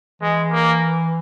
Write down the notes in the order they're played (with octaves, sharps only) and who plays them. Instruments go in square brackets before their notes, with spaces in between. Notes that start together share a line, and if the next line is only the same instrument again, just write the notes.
[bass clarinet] E3 [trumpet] G#3
[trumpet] A#3